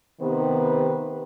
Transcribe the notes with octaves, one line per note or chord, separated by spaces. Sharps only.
C3 D#3 B3 G4 B4 C5